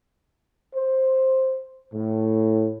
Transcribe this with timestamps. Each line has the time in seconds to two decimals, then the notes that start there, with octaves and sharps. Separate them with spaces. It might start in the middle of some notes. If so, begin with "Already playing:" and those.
0.75 C5
1.93 A2